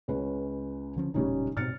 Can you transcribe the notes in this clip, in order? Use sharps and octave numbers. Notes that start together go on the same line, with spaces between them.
C#2 C#4 B4
D3 F3 C#4
E1 A#2 C#3 G3 C#4 D#4
G#2 B2 C4 F6 A6 C#7